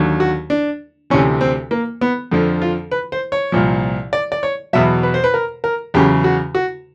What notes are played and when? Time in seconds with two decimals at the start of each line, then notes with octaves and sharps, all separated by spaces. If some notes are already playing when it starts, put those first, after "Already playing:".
Already playing: D#2 D3 F#3
0.20 F#4
0.50 D4
1.10 D2 C3 E3 C#4
1.41 C4
1.71 A#3
2.01 B3
2.32 F2 D3 F3
2.62 F4
2.91 B4
3.12 C5
3.32 C#5
3.52 C2 A#2 F3
4.13 D5
4.32 D5
4.43 C#5
4.73 E2 B2 F#3 E5
5.03 B4
5.14 C5
5.24 B4
5.34 A#4
5.64 A#4
5.94 E2 C#3 F#3 G4
6.24 F#4
6.55 F#4